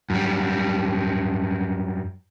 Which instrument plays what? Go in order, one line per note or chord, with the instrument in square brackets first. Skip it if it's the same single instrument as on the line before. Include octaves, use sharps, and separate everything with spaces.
[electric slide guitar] F#2 G3